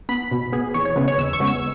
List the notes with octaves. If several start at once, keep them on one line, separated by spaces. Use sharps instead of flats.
B3 B5
B2
B3 G#4
E2 C#5
C#5
C#3 G#3 B3 B4
C#5
E2 E6
C#6
C#3 G#3 B3
E6